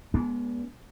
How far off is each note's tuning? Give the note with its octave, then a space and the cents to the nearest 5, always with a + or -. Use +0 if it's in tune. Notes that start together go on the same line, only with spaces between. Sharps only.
G#3 +0 B3 -35 D4 -30